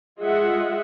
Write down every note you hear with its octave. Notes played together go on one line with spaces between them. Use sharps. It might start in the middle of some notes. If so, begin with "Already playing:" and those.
G#3 F4 G#4 D#5 E5 F#5